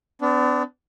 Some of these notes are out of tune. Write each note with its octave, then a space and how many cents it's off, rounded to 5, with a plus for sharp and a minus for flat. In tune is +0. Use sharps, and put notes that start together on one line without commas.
B3 +40 D4 -15